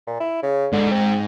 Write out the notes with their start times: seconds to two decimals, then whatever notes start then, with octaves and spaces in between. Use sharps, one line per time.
0.07 A#2
0.20 E4
0.43 C#3
0.72 G#2 D3
0.91 C4